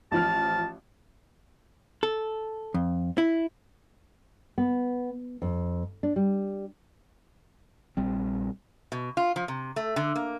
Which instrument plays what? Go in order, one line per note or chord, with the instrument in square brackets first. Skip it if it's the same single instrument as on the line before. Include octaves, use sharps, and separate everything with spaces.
[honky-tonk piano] A1 F3 F6 [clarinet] A5
[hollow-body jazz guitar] A4
F2
E4
[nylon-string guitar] B3
F2
D4
G3
[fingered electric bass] A#1 G3 C4
[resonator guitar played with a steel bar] B2
F4
F3
C3
A3
D3
A#3